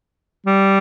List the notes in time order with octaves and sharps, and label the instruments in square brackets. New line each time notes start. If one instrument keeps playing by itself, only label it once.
[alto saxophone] G3